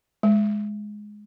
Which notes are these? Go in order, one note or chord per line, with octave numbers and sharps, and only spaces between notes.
G#3